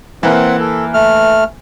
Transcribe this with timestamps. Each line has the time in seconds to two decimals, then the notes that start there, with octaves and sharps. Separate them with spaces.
0.23 E3 A#3 C4 F#5
0.60 A4
0.94 A3 F6